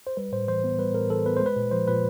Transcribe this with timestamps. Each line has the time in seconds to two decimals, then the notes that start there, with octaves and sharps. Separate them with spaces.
0.07 C5
0.17 G3 B4
0.32 A2 C5
0.48 E3 C5
0.64 B3
0.78 G3 B4
0.94 A2 A#4
1.10 E3 A4
1.26 B3 B4
1.37 G#3 C5
1.46 B4
1.56 A#2
1.71 F3 C5
1.88 A#2 B4